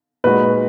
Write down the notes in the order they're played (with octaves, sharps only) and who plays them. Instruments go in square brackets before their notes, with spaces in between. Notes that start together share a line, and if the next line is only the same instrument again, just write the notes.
[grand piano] A#2 G#3 D#4 F#4 [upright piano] B4